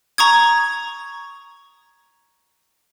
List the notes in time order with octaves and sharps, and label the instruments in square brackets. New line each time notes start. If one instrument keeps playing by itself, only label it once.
[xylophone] A#5 C#6 D#6 G#6